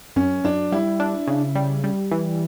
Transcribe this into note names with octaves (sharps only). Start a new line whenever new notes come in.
F#2 C#4
F#2 D4
G3 E4
D4
C#3
G3
G3
E3